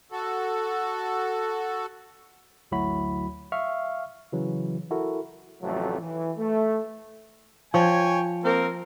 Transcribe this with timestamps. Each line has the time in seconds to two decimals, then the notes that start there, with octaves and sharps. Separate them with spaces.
0.12 F#4 A4
2.71 G1 D2 F#3 E4 F#4 B5
3.52 E5 F5 C#6 F6
4.33 C#3 E3 F#3
4.91 E4 F#4 A4 A#4
5.62 A1 F2 C3 F#3 A3
6.01 E3
6.37 A3
7.74 F3 C#5 G5 G#5
8.43 A#3 C4 A#4